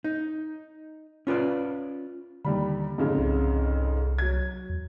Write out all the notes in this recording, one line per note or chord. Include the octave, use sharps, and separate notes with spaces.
D#4
C#4 F4 B4 D5
D#2 D3 G3 B5
F2 G#2 C#3
C2
F#3 G#6
E2